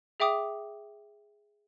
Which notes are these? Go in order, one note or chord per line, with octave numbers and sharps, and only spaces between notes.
G#4 E5 G5 D6 D#6